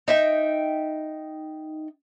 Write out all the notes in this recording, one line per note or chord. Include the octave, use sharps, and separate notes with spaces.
D#4 E5 G5